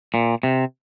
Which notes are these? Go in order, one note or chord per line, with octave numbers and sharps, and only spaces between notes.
A#2
C3